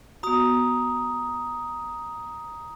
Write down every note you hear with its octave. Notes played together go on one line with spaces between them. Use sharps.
B3 F#4 A#5 D#6